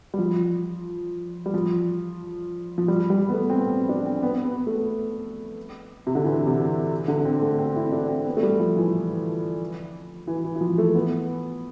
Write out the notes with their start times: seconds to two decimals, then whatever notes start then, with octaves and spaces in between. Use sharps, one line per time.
0.14 G3
0.18 F3
1.46 G3
1.54 F3
2.78 F3
2.88 G3
3.10 G3
3.29 B3
3.33 A3
3.50 C4
3.55 B3
3.71 C4
3.89 D4
4.06 C4
4.23 B3
4.45 B3
4.67 A3
6.07 C3
6.15 D3
6.24 E3
6.47 C3
7.08 D3
7.25 C4
7.42 A3
7.59 C4
7.76 E4
7.92 D4
8.09 C4
8.26 B3
8.37 A3
8.43 G3
8.60 F3
8.77 E3
10.27 E3
10.45 E3
10.56 E3
10.61 F3
10.78 A3
10.95 B3